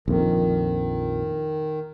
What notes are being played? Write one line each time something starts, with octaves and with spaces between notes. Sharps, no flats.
A#1 F2 D#3